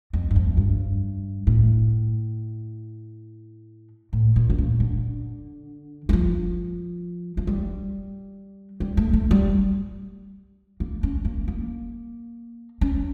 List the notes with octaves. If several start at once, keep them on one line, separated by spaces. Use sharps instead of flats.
F2
G2
F2
G2
A2
A2
A#2
D3
C#3
D3
E3
F3
F3
G3
G3
A3
A3
G3
A#3
C#4
A#3
A#3
C#4